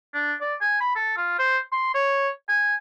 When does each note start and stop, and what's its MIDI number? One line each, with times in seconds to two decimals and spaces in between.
0.14 0.34 62
0.41 0.54 74
0.61 0.80 80
0.80 0.95 83
0.96 1.15 69
1.17 1.37 65
1.39 1.59 72
1.72 1.92 84
1.94 2.29 73
2.49 2.75 80